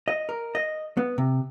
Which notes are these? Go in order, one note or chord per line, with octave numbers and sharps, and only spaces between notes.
D#5
A#4
D#5
B3
C3